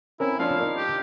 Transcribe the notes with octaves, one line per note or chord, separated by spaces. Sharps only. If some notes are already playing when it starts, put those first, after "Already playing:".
C4 C#4 E4 A#4
F3 D4 C#5 F5
D#4 A#4 D5
G4